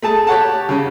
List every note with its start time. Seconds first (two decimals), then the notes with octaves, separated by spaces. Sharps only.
0.02 A3 G#4 A5
0.27 G4 C#5 F#5 A5
0.69 C#3 C#4